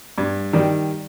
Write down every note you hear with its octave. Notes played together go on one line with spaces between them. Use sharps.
G2
D#3 G3